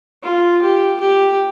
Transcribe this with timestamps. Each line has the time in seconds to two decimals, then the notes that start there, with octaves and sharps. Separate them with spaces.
0.23 F4
0.62 G4
1.00 G4